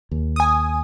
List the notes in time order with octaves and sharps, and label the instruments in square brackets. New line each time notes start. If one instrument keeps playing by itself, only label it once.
[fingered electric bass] D#2
[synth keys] G#5 D#6